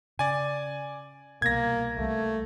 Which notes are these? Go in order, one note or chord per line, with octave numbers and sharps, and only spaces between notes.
C#3 D5 G#5
C2 B2 A#3 G#6 A#6
C2 F3 G3 A3